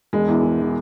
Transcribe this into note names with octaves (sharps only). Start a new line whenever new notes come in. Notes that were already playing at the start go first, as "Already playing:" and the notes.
E1 G#3
E2 E3
E1
E3